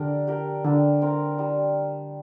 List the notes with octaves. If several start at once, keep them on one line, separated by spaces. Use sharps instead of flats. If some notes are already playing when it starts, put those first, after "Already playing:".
Already playing: D3 D4 G4 A#4 D5
G4 A#4 D5
D3 G3
C4 A#4
G3